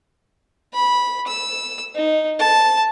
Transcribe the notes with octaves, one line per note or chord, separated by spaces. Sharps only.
B5
E6
D#4
A5